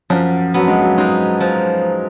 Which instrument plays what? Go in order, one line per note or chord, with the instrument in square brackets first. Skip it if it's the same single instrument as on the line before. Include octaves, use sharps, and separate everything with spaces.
[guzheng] F#2 [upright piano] F3
[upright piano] F#3 [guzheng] B3
[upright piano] G#3
F#3
[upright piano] G#3 [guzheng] D#4
[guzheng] F3